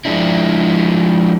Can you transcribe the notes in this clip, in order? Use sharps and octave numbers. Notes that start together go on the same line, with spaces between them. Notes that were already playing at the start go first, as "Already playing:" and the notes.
F3 G#3 D4 E4